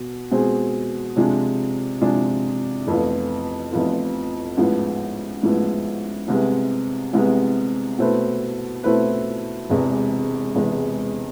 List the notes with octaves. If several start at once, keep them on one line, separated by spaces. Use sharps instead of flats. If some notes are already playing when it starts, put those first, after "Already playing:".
Already playing: B2
B2 G#3 C4 G#4
C3 F3 G#3 D4 G#4
C3 F3 G#3 D4 G#4
F1 F2 E3 B3 F4
F1 F2 E3 B3 F4
A1 G#2 F3 B3 E4
A1 G#2 F3 B3 E4
C2 C3 G#3 B3
C2 C3 G#3 B3
B2 A3 C4 E4 B4
B2 A3 C4 E4 B4
E1 E2 C3 G#3 B3
E1 E2 C3 G#3 B3